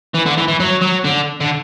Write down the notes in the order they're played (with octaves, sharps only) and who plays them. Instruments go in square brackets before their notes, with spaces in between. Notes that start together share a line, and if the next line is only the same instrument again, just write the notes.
[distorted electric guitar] E3
D3
E3
E3
F#3
F#3
D3
D3